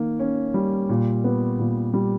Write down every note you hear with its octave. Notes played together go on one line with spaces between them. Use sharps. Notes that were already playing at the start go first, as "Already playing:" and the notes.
Already playing: D#3 A#3
C#4
G3
A#2
B3
A#2
G3